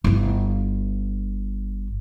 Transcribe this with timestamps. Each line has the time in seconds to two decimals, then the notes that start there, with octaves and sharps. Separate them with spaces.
0.04 G1 E4